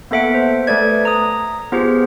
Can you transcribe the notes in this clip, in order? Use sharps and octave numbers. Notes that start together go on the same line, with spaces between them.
A#3 B3 A4 E5 F#5 D7
C5
A3 A4 B4 D5 G#6
A#5 D#6
B3 F4 G4 G#4 C5